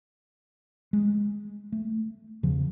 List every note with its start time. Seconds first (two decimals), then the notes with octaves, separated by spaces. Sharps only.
0.93 G#3
1.72 A3
2.43 E2 C#3 F3